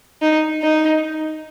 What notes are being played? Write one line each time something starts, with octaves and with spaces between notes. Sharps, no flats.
D#4
D#4